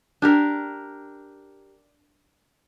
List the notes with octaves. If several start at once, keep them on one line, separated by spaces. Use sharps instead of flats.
D4 G4 A#4